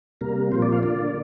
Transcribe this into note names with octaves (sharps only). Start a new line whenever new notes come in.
C3 G3 A#3 A#4
A#2 F3 A#3 C5
D5
F5
D3 A#3 D5